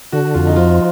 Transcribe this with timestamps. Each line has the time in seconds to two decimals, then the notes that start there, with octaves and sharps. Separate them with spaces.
0.12 D3 F#4
0.34 F2 F4
0.47 D#4
0.56 F3 F4